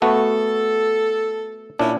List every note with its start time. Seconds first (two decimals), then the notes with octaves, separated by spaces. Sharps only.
0.02 A3 B3 F#4 A4
1.79 A#2 C#4 D4 E4